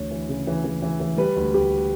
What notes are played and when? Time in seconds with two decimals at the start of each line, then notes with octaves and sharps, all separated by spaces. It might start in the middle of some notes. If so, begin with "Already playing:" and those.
Already playing: D2 E3 C#5
0.11 E3
0.29 C#3
0.47 E3
0.64 E3
0.82 E3
1.00 E3
1.17 G3 B4
1.36 D2
1.54 D2 G4